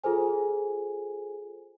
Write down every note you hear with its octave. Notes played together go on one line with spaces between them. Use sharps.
F4 G#4 A4 C5 G#5